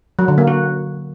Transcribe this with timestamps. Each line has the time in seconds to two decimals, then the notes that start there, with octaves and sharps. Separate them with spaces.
0.19 F#3
0.28 D3
0.38 A#3
0.47 F#4